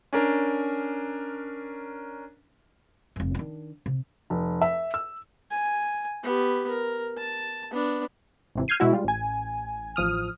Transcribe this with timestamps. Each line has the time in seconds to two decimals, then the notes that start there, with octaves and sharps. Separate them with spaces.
0.13 C#4 D4 A#4
3.16 F1 G2
3.35 D#3 D4
3.86 C3
4.30 F1
4.62 E5
4.94 E6
5.51 G#5
6.23 B3 G4
6.69 A#4
7.18 A5
7.72 B3 D4
8.55 G#1 C3 E3
8.68 F6 G6 G#6 C7 D#7
8.80 B2 G#3 E4 F#4
8.93 G3 G#3 F4
9.05 A1 G#5
9.96 A1 F3 D#6 F6